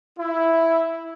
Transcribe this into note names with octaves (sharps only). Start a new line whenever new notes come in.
E4